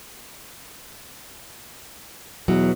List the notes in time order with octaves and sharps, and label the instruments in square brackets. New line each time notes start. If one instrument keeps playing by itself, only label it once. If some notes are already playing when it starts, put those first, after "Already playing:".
[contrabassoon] E2 [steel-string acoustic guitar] B2 F#3